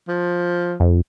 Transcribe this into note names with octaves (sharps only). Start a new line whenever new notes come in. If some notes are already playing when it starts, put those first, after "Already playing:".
F3
F2